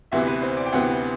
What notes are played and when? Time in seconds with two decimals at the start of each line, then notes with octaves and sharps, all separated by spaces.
0.12 D2 C3 E3 B3 E5
0.27 B4
0.42 C5
0.57 D5
0.66 G5
0.73 D2 C3 E3 B3 F#5